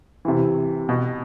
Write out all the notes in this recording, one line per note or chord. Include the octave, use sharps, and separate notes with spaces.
C3 E3
B2